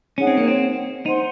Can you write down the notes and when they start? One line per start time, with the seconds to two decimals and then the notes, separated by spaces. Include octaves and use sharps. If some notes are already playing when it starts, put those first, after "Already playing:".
0.17 C#4 D#4 G#4 C#5 F#5
0.27 C4
0.37 A#3
0.48 C4
1.06 D#4 C5 F#5 C6